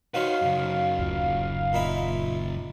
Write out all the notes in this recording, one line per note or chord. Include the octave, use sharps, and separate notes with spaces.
D#3 C#4 F#4 B4 C5 F5
F#2 C#3
D1 F4
A#2 D#4 E4